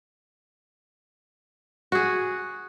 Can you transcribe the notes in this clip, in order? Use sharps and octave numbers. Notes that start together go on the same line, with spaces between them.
F#4 G#4